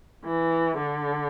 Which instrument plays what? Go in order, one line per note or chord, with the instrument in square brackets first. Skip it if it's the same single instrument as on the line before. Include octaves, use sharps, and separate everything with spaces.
[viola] E3
D3